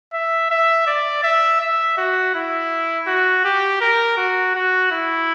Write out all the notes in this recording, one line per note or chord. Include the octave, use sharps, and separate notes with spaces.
E5
E5
D5
E5
E5
F#4
E4
F#4
G4
A#4
F#4
F#4
E4